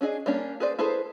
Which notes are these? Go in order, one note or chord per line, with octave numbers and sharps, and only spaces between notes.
C#4 D4 G#4 D#5
G3 A#3 C#4 D4
G#4 B4 C5 D5
E4 G#4 A4 B4 C5